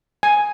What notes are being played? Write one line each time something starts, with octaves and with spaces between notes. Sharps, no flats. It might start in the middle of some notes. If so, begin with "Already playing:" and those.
G#5